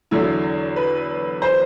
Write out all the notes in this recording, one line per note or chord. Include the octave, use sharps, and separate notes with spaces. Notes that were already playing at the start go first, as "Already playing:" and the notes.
E2 D3 F#3 E4
B4
C5